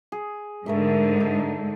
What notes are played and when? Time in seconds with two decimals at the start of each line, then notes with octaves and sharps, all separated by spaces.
0.12 G#4
0.66 G#2 D3 A3 A#4 E5
1.20 D#4 A4